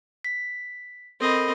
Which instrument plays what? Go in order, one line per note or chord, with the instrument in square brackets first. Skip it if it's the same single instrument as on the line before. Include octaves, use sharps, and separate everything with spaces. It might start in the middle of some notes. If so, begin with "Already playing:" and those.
[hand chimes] B6
[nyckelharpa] C4 D#5 [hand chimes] A4 A#4 B5